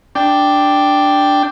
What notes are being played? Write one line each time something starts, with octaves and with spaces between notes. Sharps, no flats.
D4 G5